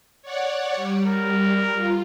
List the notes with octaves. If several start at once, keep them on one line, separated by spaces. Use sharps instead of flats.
C#5 D5 F#5
G3
A#4
F4